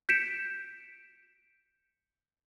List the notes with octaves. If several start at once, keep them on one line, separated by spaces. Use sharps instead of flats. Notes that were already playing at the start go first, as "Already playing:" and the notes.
G6 B6 C#7 D7 E7